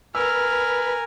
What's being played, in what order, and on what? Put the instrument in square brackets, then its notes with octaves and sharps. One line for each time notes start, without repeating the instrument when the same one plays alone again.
[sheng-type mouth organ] A#4 G#5 [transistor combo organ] B4 [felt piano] E6 [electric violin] F6